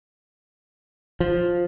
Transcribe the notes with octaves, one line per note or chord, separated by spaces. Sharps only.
F3